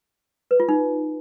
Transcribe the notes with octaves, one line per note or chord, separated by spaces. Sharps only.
B4
F4
D#4